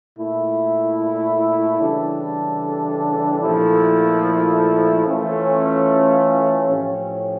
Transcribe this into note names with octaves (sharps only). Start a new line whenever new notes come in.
A#2 A3 E4
C#3 E3 G3 D4 A4
A#2 F3 A3 E4 A4
E3 A3 C#4 F4
A2 F3 C#4 G4